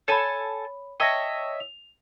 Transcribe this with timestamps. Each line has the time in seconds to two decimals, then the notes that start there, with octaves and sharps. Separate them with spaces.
0.08 A4 C#5 G#5 A5 B5
1.00 C#5 D#5 E5 G5 A5 A#6
1.60 F7